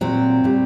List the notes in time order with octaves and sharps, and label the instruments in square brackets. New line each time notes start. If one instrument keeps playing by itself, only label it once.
[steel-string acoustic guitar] A#2 F#3 C4
A#2 G3